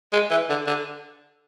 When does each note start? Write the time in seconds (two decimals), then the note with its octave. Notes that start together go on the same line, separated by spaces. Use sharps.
0.13 G#3
0.30 E3
0.49 D3
0.67 D3